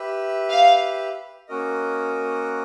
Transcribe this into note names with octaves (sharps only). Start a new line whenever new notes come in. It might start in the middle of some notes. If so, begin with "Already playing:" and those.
Already playing: G4 B4 E5
F5
A#3 C#4 F#4 A#4 D#5